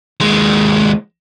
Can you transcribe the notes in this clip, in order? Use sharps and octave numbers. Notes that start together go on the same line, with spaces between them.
D#2 G#3